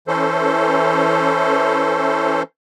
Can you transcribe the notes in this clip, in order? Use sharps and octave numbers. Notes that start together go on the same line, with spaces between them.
E3 C#4 A4 C5